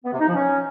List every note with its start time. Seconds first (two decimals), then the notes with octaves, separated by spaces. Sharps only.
0.04 B3
0.12 C3
0.20 D#4
0.27 F3
0.35 C#4